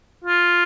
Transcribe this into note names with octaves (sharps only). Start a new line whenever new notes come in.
F4